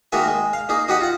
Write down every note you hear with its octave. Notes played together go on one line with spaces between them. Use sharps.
D#3 G#3 A#3 F#4 E5 G#5
G#3
F5
A#3 D#4 G#4
D#4 F#4 G4 D#5 F#5
F4 F#5